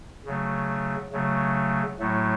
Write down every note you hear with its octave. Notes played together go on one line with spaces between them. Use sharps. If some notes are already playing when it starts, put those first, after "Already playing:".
C#3 F#3 A3
C#3 F#3 A3
A2 F#3 A3